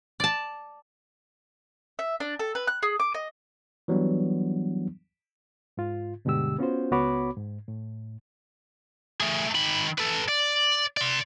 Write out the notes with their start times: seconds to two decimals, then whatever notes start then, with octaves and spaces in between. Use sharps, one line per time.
0.20 D5 A5
1.99 E5
2.20 D4
2.39 A4
2.55 B4
2.67 F#6
2.83 G#4
2.99 D6
3.14 D#5
3.88 E3 F#3 G3 B3 D4
5.78 G#2 F4
6.25 G2 B2 D3 G#3 G4 E6
6.58 B3 C#4 F4 F#4 C5
6.91 C#2 B3 F#4 C#5 B5 D6
7.37 G#2
7.68 A2
9.21 A3 G#4
9.55 D#3 B5
9.98 A4 B4
10.29 D5
10.97 D5 C6